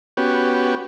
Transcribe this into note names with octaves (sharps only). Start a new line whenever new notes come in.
B3 C#4 F#4 G4